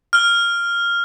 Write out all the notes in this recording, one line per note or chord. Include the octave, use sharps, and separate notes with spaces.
F6 G7